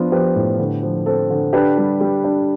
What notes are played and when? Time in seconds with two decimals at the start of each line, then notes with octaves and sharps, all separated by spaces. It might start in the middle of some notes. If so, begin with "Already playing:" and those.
Already playing: F3 B3 D4 F4
0.12 F3 G4 B4
0.35 A2
0.59 D3
0.83 F3
1.06 C4 A4 C5
1.30 D3
1.53 D4 G4 B4
1.77 G3
2.01 G3
2.24 D4